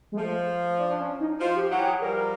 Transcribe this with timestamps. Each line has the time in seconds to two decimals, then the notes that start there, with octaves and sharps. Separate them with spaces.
0.12 G#3
0.17 F3 A3
0.78 D4
0.90 D4
1.00 C#4
1.20 D#4
1.40 F3 F4
1.56 G4
1.71 E3 F#3 F#4
1.79 G4
1.86 G#4
2.01 F3 G3 A#4